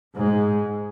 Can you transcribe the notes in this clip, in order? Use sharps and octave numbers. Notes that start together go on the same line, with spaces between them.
G#2